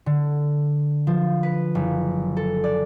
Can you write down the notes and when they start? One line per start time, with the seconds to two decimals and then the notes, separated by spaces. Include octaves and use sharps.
0.06 D3
1.07 F3
1.43 B4
1.75 F#1
2.37 A4
2.64 D5